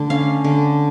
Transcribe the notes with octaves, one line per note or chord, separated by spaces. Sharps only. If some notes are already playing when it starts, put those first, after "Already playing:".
Already playing: D3 A3
C#4 F5
D3